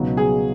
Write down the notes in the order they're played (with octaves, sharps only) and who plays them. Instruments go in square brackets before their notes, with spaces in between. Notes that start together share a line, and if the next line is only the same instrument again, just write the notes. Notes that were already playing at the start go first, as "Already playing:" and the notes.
Already playing: [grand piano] C#2 B2 F#3 B3 D#4
[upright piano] G#4